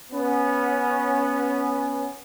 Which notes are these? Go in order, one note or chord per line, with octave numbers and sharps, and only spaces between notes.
B3 C#4